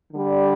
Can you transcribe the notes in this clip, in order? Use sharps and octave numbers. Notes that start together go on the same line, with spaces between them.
D3 G3